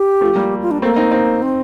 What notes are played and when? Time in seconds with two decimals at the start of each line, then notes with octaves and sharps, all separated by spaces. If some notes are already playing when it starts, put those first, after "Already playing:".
Already playing: G4
0.21 F3 A3
0.36 G3 A#3
0.62 F4
0.71 D4
0.82 A3 A#3 C4
0.96 C4 D#4
1.11 C4 D#4
1.42 C4